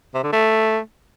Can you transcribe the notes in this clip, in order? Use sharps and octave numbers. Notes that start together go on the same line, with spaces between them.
C3
D3
A3